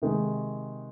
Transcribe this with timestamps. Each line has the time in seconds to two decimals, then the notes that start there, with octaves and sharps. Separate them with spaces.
0.02 C3 D#3 G#3